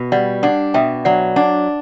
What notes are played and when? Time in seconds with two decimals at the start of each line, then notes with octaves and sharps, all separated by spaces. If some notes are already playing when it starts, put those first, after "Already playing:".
Already playing: B2
0.12 G3 D5 F#5
0.43 D4 D5 F#5
0.74 B2 E5 G5
1.05 F#3 D5 F#5
1.36 D4 D5 F#5